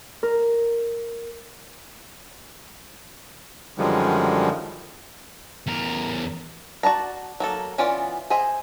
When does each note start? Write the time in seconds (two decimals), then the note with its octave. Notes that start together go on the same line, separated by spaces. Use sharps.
0.23 A#4
3.78 F#2 D3 D#3 F3 G3 G#3
5.67 E2 A#4
6.83 F#4 D5 A5 A#5
7.40 F#3 A#3 A4
7.78 E3 B3 C#4 F4 D5
8.30 G#4 C5 D#5 E5 G#5